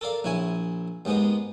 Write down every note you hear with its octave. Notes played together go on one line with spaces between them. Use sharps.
A4 A#4 D5 F5
A#1 E4 C#5 G#5
D#2 G#2 G#3 B3 D#5